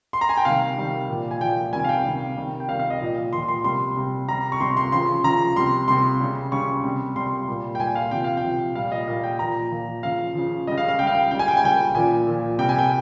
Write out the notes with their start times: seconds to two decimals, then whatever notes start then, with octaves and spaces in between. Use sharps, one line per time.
0.13 C6
0.21 A#5
0.29 G#5
0.37 G5
0.45 C3 D#3 G3 F5
0.77 C3 D#3 G3
1.09 A#2 F3
1.31 G#5
1.41 A#2 F3 G5
1.73 C3 D#3 G3 G#5
1.84 F5
1.89 G5
2.05 C3 D#3 G3
2.37 C3 D#3 G3
2.60 G5
2.69 C3 D#3 G3 F5
2.79 F5
2.90 D#5
3.01 A#2 F3 D#5
3.33 A#2 F3 C6
3.48 C6
3.64 C3 G3 C6
3.96 C3 G3
4.28 C3 G3 A#5
4.52 C#6
4.60 C3 G3 C6
4.77 C6
4.92 C#3 F3 C6
5.24 C#3 F3 A#5
5.56 C3 G3 C6
5.88 C3 G3 C6
6.20 C#3 G3
6.52 C#3 G3 C#6
6.84 C3 G3
7.16 C3 G3 C6
7.48 A#2 G3
7.75 G5
7.79 A#2 G3 G#5
7.95 F5
8.11 C3 F3 G5
8.24 F5
8.37 G5
8.43 C3 F3
8.75 A#2 G3 F5
8.92 D#5
9.07 A#2 G3 F5
9.24 G5
9.39 A#2 F3 A#5
9.71 A#2 F3
10.03 C#3 F3 F5
10.35 C#3 F3
10.67 G3 D#5
10.72 C#3
10.78 F5
10.88 F5
10.99 C#3 G3 G5
11.07 F5
11.15 G5
11.31 C#3 G5
11.35 G3 G#5
11.48 G5
11.57 G#5
11.63 C#3 G3 G5
11.95 A#2 F3 G#5
12.27 A#2 F3
12.59 C3 G3 G5
12.69 G#5
12.79 G5